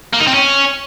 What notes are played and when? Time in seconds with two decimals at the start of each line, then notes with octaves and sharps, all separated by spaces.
0.13 A#3
0.21 D#4
0.28 C4
0.35 C#4